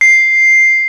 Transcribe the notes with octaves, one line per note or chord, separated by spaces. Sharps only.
C7